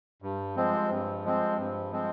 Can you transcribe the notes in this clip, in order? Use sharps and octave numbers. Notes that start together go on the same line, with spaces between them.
G2
F3 G#3 C4
G2
F3 G#3 C4
G2
F3 G#3 C4